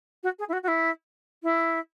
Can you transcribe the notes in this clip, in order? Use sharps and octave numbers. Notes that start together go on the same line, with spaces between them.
F#4
G#4
E4
F#4
F#4
E4
E4